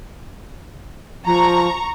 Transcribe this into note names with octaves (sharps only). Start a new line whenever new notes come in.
F3 A#5 C#6